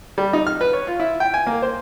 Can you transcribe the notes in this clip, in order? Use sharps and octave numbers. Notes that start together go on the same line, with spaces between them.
G3
D#4
F6
B4
C#5
F4
E4
G5
G#5
A#3
C5